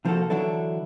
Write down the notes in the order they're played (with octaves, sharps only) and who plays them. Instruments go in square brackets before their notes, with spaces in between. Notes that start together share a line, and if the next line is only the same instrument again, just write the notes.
[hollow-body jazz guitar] C3 F3 A#3 F4 F#4 A4
D3 E3 F#3 D4 E4 A4